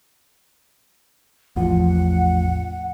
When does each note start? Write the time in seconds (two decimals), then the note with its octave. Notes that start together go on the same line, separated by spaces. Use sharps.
1.56 A1 E2 F3 F#5